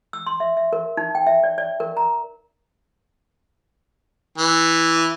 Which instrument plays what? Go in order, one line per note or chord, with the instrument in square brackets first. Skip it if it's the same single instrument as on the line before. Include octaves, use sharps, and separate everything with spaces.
[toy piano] E6
C6
E5
E5
A#4
D#4
G5
E5
D5
D5
A#4
A#5
[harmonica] E3